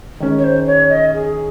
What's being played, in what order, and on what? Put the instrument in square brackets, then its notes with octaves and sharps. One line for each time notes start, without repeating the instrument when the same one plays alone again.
[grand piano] D#3 G#3 C#4
[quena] C#5
C5
C#5
D#5
G#4